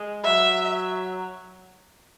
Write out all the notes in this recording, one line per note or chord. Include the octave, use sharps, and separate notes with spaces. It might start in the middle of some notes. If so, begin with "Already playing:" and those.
Already playing: G#3
F#3 E5